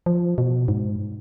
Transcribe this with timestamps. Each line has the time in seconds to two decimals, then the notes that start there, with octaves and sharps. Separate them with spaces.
0.06 F3
0.38 B2
0.68 G#2